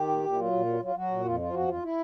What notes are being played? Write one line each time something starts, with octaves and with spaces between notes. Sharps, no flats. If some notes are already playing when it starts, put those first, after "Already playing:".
Already playing: D#3 G4
A#2
A#2
E4
F#3 F4
A#2
F#3
F#3 F4
F#3 F#4
A#2
F2 F4
F3 F4
F2 F#4
F2 F4
E4